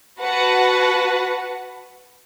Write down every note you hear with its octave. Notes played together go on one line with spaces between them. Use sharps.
F#4 B4 F#5 A5